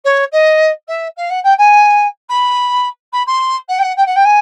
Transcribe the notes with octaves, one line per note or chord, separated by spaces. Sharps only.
C#5
D#5
E5
F5
F#5
G5
G#5
B5
B5
C6
F#5
G5
F#5
G5
F#5
G5
G#5